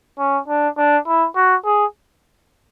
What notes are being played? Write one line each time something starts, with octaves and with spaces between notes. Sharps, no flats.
C#4
D4
D4
E4
F#4
G#4